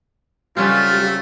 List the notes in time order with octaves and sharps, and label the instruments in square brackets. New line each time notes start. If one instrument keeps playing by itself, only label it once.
[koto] C#3 F#3 C4 [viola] G3 A4 [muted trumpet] A3 [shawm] F4